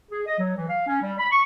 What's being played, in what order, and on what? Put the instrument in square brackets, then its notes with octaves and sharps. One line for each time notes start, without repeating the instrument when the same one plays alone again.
[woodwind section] G#4
D#5
F#3
E3
F5
C#4
G3
B5
C#6